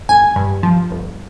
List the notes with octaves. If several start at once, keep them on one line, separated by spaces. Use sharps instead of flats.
G1 G#5
G2
F3
G1